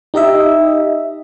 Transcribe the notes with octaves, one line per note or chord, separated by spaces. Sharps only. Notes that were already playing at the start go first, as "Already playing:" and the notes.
D#4 G4 D#5 E5